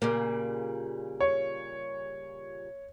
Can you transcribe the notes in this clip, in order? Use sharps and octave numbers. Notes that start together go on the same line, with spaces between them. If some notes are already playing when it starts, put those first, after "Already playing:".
A#2 C#3 G3 A#3
C#5